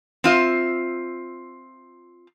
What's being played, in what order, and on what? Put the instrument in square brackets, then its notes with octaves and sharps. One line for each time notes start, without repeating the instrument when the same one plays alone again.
[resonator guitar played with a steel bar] C4 F4 E5